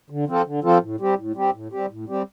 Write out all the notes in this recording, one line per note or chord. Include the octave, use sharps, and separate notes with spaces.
D3
F3 C4 F4 A4
D3
F3 C4 F4 A4
A2
G3 C4 G4
A2
G3 C4 G4
A2
G3 C4 G4
A2
G3 C4 G4